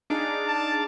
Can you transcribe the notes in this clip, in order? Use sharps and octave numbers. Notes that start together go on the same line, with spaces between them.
D4 D#4 G#4 D5 F5 D6
A5